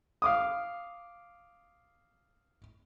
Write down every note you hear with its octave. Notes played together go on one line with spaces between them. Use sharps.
F5 D6 D#6